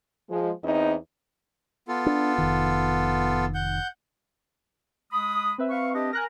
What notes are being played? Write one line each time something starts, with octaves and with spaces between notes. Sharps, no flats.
F3 G#3
E2 C4 D#4 E4 D#5
B3 F4 A4
D4
F1 D#3
F#5 G6
G#3 B5 D#6
C4 B4 E5
F5 C#6
D4 G4 D#5
A#4 G#5 F#6 A#6